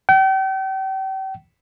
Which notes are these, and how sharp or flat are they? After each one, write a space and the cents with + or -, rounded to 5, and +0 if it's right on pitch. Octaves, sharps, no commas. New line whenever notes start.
G5 -40